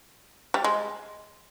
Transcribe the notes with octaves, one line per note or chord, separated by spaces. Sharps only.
G3
G#3